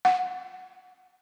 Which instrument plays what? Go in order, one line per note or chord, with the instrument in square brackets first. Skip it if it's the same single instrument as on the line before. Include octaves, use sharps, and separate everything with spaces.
[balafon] F#5